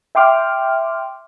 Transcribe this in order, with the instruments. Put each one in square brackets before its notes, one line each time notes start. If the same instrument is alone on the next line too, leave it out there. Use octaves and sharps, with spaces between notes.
[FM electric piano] E5 G5 C6 D6 F6